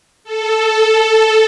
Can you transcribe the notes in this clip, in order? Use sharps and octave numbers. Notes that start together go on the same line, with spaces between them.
A4